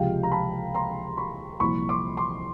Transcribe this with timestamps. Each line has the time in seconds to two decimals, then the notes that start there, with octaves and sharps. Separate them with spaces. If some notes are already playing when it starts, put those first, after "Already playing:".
Already playing: C#2 C3 F3 G#3 F5 G5
0.23 A#5
0.32 A5 B5
0.75 A#5 C6
1.17 B5 C#6
1.60 C2 A#2 F3 B5 C#6
1.89 C6 D6
2.17 C6 D6